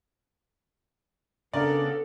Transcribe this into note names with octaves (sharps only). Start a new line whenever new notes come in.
C#3 B3 D4 A4 A#4 D5